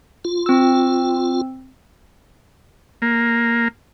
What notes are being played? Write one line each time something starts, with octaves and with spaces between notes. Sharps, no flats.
F4
C4 E6
A#3